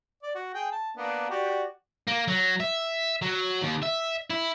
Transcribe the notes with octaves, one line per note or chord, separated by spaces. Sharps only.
D5
F#4
G#4 G5
A5
A#3 B3 D4
F#4 G4 D5
A#3
F#3
E5
F#3
D#2
E5
E4